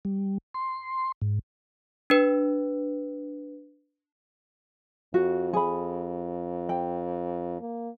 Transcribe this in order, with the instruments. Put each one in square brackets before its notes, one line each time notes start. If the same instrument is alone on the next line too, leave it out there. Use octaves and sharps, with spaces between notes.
[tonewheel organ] G3
C6
G#2
[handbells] D4 B4
[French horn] F2 [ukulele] F#4
[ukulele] G#4 B5
G5
[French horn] A#3